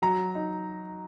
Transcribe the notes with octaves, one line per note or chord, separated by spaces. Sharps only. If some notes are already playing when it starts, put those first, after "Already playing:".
F#3 A#5
D#4